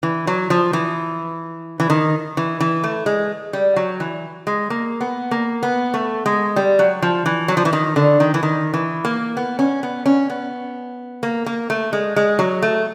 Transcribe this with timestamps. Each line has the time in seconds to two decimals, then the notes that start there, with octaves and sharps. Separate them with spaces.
0.03 E3
0.27 F#3
0.50 F3
0.73 E3
1.80 E3
1.90 D#3
2.37 E3
2.60 E3
2.84 A3
3.06 G#3
3.53 G3
3.76 F#3
4.00 E3
4.47 G#3
4.70 A#3
5.01 B3
5.31 A#3
5.63 B3
5.94 A3
6.26 G#3
6.56 G3
6.79 F#3
7.02 F3
7.26 E3
7.48 F#3
7.57 F3
7.65 E3
7.73 D#3
7.96 D3
8.20 D#3
8.34 E3
8.43 D#3
8.74 E3
9.05 A#3
9.37 B3
9.59 C#4
9.83 B3
10.06 C#4
10.30 B3
11.23 A#3
11.46 A#3
11.70 A3
11.93 G#3
12.16 G#3
12.39 F#3
12.62 A3